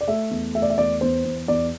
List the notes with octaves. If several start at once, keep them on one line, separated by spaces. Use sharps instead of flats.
D5
A3 E5
E2
A3 E5
D5
E5
E2 D5
E2 C5
E2
E2 D5